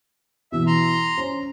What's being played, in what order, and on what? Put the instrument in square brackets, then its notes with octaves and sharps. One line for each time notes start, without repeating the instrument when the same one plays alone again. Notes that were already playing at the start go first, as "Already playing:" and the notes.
[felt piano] B2 E3 [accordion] E5
[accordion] A#5 C6
[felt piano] C#4 C5